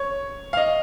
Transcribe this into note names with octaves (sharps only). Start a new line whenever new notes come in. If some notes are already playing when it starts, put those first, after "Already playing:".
Already playing: C#5
F5
D#5